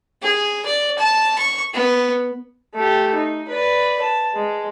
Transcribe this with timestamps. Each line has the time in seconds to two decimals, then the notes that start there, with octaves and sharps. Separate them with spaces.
0.22 G#4
0.65 D5
0.99 A5
1.38 C#6
1.74 B3
2.74 A3 G4
3.15 D#4
3.48 B4 D5
4.01 A5
4.35 G#3